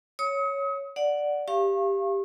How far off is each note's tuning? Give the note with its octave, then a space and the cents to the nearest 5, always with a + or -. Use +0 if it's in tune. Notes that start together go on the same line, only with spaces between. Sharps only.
C#5 +0 D#6 +35
D5 +0 F#5 +0
G4 +5 F5 -25 C#6 -35